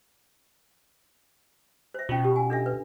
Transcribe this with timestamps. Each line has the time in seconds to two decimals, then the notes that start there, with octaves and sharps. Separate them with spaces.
1.94 C5 E5
2.09 B2 C#4 F4
2.24 G4
2.36 G#5
2.50 D4 A4 E5
2.66 B4